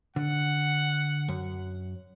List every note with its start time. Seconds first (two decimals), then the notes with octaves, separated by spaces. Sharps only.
0.16 D3 F#5
1.28 F#2